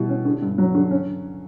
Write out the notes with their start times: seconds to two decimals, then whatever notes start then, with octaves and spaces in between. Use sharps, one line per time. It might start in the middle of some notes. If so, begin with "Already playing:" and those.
Already playing: B2 G3 E4
0.09 C#4
0.25 D3
0.42 G2
0.58 F#3
0.75 D3
0.91 C#4